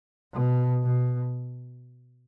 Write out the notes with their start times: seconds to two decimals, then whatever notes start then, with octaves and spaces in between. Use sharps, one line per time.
0.33 B2
0.83 B2